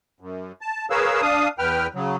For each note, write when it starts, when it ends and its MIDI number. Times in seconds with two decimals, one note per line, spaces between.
0.20 0.52 42
0.61 0.86 81
0.90 1.21 68
0.90 1.21 70
0.90 1.21 71
0.90 1.21 73
0.90 1.21 77
0.90 1.21 88
1.22 1.48 62
1.22 1.48 77
1.22 1.48 87
1.59 1.87 40
1.59 1.87 71
1.59 1.87 79
1.59 1.87 89
1.95 2.16 49
1.95 2.16 54